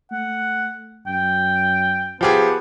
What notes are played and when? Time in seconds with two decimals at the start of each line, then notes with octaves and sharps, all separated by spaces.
0.12 A3 F#5
1.07 F#2 G5
2.21 F3 B3 G4 G#4